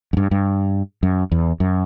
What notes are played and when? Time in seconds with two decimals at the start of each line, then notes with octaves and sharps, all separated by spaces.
0.13 F#2
0.17 G2
0.31 G2
1.03 F#2
1.32 E2
1.60 F#2